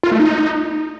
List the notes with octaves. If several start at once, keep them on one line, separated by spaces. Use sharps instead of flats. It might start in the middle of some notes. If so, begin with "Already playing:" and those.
F4
A3
D#4